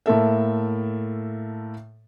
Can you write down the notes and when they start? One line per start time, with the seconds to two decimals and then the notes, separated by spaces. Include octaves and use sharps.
0.06 A2 A#3 A4 E5